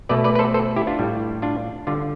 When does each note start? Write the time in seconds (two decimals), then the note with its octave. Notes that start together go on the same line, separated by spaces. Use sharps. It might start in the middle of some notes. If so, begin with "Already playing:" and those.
0.09 B2 A3 B4 D5
0.24 B4 D5
0.35 B4
0.39 A4 C5
0.54 A4 C5
0.76 E4 G4
0.87 D4 F4
0.99 A2 G3
1.42 D4 F4
1.87 D3 G3 D4 F4